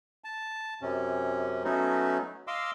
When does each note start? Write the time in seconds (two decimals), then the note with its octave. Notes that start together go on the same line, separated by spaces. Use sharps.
0.24 A5
0.82 F#2 C3 C#4
1.64 F#3 A3 B3 C#4 D#4 F#4
2.47 D#5 F5 C6 D6 E6